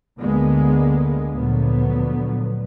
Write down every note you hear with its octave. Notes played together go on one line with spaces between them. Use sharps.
D2 D3 G#3 A#3 B3
D2 A#2 D3 F3 F#3 B3